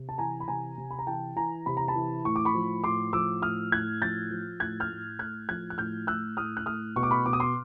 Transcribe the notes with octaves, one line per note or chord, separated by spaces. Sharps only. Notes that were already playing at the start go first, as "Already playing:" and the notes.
Already playing: C3
A5
E3 G#5 A#5
B5
C3 G#5 A#5
C3
B5
A#5
E3 G5 A5
E3 G#5 A#5
C3 B5
A#5
A5 B5
E3
A2 C#6
D6
B5 C#6
F3
A2 C6 D6
F3 D6 E6
A2 D#6 F6
A2 F#6 G#6
F3 G6 A6
F3
A2 F#6 G#6
F6 G6
A2
A2 F#6 G#6
F3 F#6 G#6
F#6
A2 F6 G6
A2 E6 F#6
A2 D#6 F6
F#6
A2 D#6 F6
B2 C#6
D6
B5 C#6
B2 D6
D#6
C6 D6